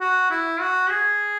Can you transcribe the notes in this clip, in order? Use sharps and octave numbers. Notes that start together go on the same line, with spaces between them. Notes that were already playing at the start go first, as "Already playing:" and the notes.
F#4
E4
F#4
G#4